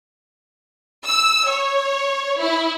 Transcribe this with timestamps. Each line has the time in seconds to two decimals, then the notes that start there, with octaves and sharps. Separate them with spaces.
1.06 E6
1.48 C#5
2.39 E4